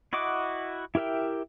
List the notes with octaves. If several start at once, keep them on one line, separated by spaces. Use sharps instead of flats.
E4 F#4 D#5 F#5 D6
E4 G4 A#4 E5 G5